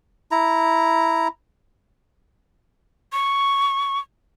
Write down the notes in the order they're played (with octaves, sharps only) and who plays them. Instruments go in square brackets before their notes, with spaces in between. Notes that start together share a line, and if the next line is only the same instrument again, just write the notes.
[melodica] E4 A#5
[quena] C#6